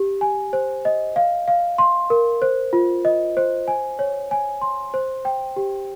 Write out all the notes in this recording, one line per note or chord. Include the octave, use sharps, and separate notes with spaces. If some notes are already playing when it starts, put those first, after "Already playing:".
Already playing: G4
G#5
C5
D#5
F5
F5
C6
A#4
C5
F4
D#5
C5
G#5
C#5
G#5
C6
C5
G5
G4